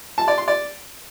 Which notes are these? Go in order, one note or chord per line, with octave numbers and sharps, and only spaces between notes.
A5
D5
C6
D5